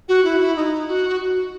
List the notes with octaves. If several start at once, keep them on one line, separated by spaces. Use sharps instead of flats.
F#4
E4
E4
D#4
F#4